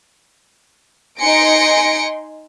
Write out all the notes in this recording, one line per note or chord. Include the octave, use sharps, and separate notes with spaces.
D#4 G#5 C6 A#6 C#7 D7